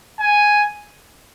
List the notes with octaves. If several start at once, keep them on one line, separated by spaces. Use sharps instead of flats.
G#5